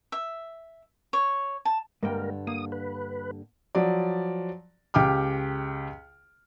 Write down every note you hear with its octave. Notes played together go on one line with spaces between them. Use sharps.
E5
C#5
A5
G2 D3 G#3 A#3 A#4 G5
A#3 D#6
B4
F3 F#3 D5
C#2 G4 G5 D6 F6